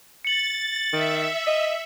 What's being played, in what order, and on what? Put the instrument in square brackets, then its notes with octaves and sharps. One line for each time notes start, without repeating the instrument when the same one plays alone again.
[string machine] A6 [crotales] C#7 F#7
[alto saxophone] D#3 [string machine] E5
[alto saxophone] D#5